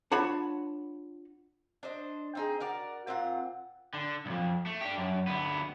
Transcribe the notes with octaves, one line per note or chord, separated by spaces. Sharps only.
D4 F4 C#5 F#5 A5 B5
D4 C5 D#5
C4 D#4 G#4
F#4 A#4 D5
A#2 C4 F4 F#5
D3
C2 F2
A3
D4 G4
F#2
D2 B3